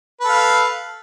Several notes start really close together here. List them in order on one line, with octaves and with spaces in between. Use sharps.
B4 A4 F5